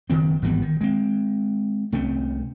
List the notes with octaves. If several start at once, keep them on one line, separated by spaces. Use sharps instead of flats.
F#1 D#3 F#3 C4
G#1 E3 G3 B3
D#3
G#3 C4
C2 A3 C4 C#4